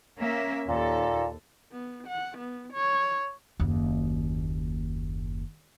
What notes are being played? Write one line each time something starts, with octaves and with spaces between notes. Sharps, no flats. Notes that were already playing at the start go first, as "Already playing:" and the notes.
A#3 C#4 E5
D#2 A#2 A4
B3
F#5
B3
C#5
F#1 D#2